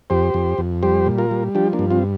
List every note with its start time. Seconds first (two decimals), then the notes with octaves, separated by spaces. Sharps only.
0.10 F2 G4 C5
0.34 F2
0.58 F2
0.83 G3 G4 C5
1.06 A#2
1.18 F4 A#4
1.31 G3
1.55 F3 D4 G4
1.73 A#3 D4
1.79 G2
1.90 C4 F4